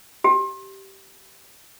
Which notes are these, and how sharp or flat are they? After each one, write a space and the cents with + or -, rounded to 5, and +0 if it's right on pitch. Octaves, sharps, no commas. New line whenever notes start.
G4 -15